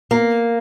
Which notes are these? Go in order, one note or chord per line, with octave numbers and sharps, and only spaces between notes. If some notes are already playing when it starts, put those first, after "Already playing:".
A#3